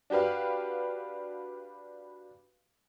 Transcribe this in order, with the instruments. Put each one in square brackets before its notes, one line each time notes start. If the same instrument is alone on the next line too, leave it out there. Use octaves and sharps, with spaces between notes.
[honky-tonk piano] D4 F#4 G4 B4 F5